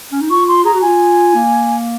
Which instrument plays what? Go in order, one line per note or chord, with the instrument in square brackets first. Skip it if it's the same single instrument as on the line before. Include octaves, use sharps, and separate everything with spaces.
[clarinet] C#4
D#4
[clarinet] F4 [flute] C#6
[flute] C6
[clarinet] G#4 [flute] A#5
[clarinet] F#4
[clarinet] F4 [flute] G#5
[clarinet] A#3